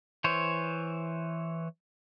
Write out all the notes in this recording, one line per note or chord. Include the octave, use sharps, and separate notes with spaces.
E3 C5 C#5